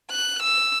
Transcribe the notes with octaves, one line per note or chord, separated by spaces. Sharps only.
F#6
E6